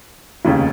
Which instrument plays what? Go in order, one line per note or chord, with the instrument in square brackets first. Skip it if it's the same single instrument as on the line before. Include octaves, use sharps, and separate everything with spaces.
[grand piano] F1 D#2 C#3